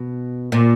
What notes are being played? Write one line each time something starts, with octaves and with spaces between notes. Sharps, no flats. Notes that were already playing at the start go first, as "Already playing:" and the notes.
Already playing: B2
A#2